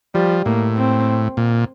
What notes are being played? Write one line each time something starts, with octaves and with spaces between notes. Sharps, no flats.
F3 G3
A2 A#3
C4
A#2